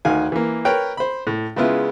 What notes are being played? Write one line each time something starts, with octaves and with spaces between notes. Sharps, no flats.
D2 D#3 F5 G#5
E3 A#3
A#4 B4 C#5 G5
C5 B5
A2
C#3 G#3 B3 E4 F4